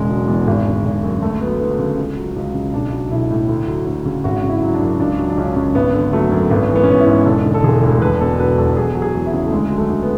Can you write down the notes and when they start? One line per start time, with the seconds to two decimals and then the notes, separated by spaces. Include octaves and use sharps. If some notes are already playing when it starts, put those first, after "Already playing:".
Already playing: E1 C#3 G#3
0.10 F#3
0.28 E2
0.47 G#1
0.66 D3
0.85 G#1
1.03 F#2
1.22 D2 A3
1.41 F#3 B3
1.60 D2 B3
1.79 C#3
1.98 C#2
2.17 F#3
2.36 C#2
2.55 C#3
2.73 B1 D4
2.92 F#3
3.11 B1 E4
3.31 A2
3.49 D2
3.68 F#3
3.86 D2
4.06 C#3
4.24 G#1 F#4
4.43 C#3
4.49 E4
4.62 F#3
4.74 D4
4.81 F#2
5.00 C#2 D4
5.19 F#3
5.30 D4
5.37 C#2 C#4
5.56 C#3
5.75 G#1 B3
5.94 D3
6.13 F#3 A3
6.32 F#2
6.50 G#1 B3
6.69 E3
6.76 B3
6.84 C#4
6.89 G#1 B3
7.00 E4
7.07 G#2
7.26 E1 A4
7.45 D3
7.54 A4
7.63 E1 G#4
7.83 D2
8.01 E1 B4
8.20 B2 A4
8.38 F#3 B4
8.58 E2 A4
8.77 E2 G#4
8.95 F#3
9.02 G#4
9.14 E2
9.26 E4
9.34 C#3
9.46 A3
9.52 D2 G#3
9.71 F#3
9.78 A3
9.90 D2
10.03 B3